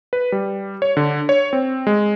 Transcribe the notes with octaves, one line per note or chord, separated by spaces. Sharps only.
B4
G3
C#5
D3
C#5
C4
G#3